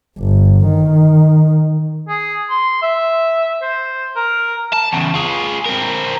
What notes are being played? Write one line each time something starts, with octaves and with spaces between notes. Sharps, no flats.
G1
D#3
G#4
C6
E5
C5
A#4
A5
E2 C#3
F4 G#4
C4 A#4